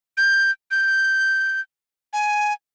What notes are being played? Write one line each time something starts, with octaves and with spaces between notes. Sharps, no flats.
G6
G6
G#5